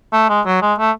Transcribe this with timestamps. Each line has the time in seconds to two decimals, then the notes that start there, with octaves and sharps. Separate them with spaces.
0.13 A3
0.29 G#3
0.46 F#3
0.62 G#3
0.79 A3